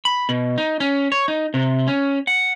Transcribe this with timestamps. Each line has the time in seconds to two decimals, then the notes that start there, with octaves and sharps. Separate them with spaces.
0.05 B5
0.29 B2
0.58 D#4
0.80 C#4
1.12 C#5
1.28 D#4
1.54 C3
1.87 C#4
2.27 F#5